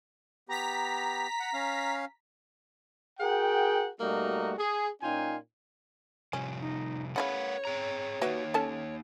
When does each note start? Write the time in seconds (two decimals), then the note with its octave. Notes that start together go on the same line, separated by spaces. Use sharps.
0.49 B3 G4 A#5 B6
1.40 F#5
1.54 C#4 F5
3.20 F#4 G#4 A#4 F#5 G5
4.00 B2 G3 A3 A#3 D#4 F#4
4.58 G#4
5.02 A#2 C#4 D#4 F4 G5 G#5
6.33 C3 F3 G3 C#4
6.61 D#4
7.16 C#3 E4 A#4 B4 C#5 F5 F#5
7.65 C4 G#4 A#5
8.22 A#3 D#4 F#4 B4 E5
8.54 C#4 A4 A5